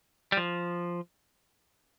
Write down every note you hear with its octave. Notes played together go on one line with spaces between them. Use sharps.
G3
F3